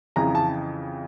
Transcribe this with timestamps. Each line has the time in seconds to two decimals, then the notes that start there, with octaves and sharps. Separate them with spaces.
0.16 F2 C#3 E3 A#5
0.35 A5